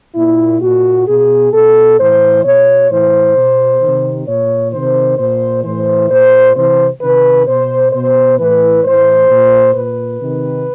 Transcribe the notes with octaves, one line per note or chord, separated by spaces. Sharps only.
A#2 E4
A#2 F#4
B2 G#4
B2 A4
A2 E3 C5
B2 C#5
A2 E3 C5
B2
C3 D#3
A#2 C#5
C3 D#3 C5
A#2 C5
A2 E3 C5
A#2 C5
C3 E3 C5
C3 D#3 B4
B2 C5
B2 C5
A2 E3 B4
A2 E3 C5
A#2
A#2 B4
C3 D#3